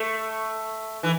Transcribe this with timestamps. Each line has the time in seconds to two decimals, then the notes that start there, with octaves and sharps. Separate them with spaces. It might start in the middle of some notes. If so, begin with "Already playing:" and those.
Already playing: A3
1.03 E3